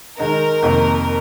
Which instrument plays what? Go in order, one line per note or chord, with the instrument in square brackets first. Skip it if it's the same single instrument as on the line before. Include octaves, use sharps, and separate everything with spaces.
[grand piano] D#3 G#3 D#4 [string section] A#4
[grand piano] F2 C3 D#3 A#3